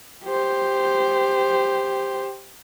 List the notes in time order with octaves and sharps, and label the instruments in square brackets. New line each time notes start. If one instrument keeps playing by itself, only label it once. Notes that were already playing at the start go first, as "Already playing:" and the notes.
[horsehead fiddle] G4 C5